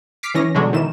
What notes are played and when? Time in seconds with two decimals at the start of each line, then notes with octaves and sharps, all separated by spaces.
0.23 D6 F6 B6 C7 D7
0.34 E3 C#4 A#6
0.55 B2 D3 F#3 G#3 D4 F#4
0.73 D#3 E3 E7